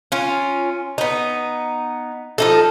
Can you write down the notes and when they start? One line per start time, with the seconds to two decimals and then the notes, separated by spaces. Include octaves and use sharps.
0.12 C#4 F4
0.98 B3 D#4
2.38 F3 D#4 A4